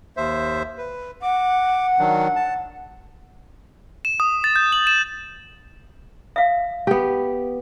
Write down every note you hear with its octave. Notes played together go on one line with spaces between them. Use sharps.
D#2 C5 E5
B4
F#5 D6
D#3 F#3 D4
A5
E7
D#6
A6
G6
F#7
E7
E5 F5
B3 G4 A5